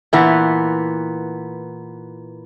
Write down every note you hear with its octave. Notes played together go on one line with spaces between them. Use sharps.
A#2 E3 B3